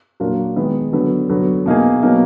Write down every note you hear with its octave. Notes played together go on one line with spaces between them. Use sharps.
A#2 F#3 D4 F4 A#4
D#3 G#3 B3
D3 F#3 B3
D3 F#3 B3
B2 A#3 D#4 G#4
B2 F#3 A#3 D#4